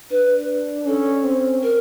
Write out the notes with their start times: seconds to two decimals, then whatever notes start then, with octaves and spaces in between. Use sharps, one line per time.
0.11 D4 B4
0.86 C#4 A4
1.24 C4
1.62 A#4